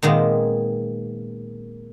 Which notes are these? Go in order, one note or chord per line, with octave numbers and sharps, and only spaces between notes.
A#2 D#3 G#3 B3 C4